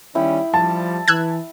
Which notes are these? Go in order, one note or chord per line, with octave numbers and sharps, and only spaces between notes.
D#3 G3 C#4 E4 G5 D#6
F3 G3 A5
E3 E6 F#6 G#6